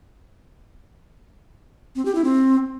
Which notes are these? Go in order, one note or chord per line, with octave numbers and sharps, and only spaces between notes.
C4
G4
E4
C4